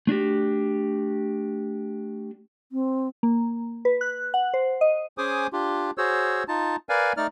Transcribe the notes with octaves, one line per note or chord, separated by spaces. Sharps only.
A3 D4 F#4 G4
C4
A#3
B4
F#6
F#5
C5
D#5
C#4 G#4 C5 G#5 D6 D#6
D4 F4 G4
F#4 G#4 C5 C#5 E6
D#4 F4 A5
A#4 B4 D5 F5 G#5
A3 D#4 D5 F6